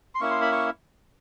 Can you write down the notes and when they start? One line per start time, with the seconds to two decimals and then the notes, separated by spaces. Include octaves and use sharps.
0.15 C6
0.20 A#3 C#4 E4 C#6
0.31 C6
0.42 B5
0.52 C#6